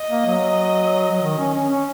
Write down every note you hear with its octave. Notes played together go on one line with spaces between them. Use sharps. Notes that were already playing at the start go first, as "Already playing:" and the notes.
Already playing: D#5
A#3
F#3
F#3
D#3
C#4
C#4
C#4